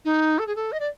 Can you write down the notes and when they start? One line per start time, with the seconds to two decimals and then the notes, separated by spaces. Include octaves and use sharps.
0.05 D#4
0.38 A4
0.47 G#4
0.56 A4
0.72 D#5
0.80 D5